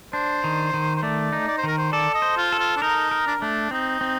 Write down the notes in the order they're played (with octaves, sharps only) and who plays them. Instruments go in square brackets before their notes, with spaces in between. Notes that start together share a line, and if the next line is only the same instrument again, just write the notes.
[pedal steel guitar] D4 [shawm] C5
[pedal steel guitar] D#3
D#3
[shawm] C5
[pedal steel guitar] A3 [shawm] D5
[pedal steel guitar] D#4
[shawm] D5
C5
[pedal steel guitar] D#3 [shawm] A#4
[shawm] C5
[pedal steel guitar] A4 [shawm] D5
[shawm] D#5
[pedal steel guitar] C5
[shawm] F4
[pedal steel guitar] A4
[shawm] F4
D4
[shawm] D#4 [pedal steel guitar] A#4
[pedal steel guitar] A#4
[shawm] D4
[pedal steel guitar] A3 [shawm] D4
[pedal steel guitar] C4 [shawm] D#4
[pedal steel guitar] C4